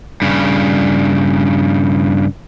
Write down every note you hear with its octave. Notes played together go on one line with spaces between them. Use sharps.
G2 C#3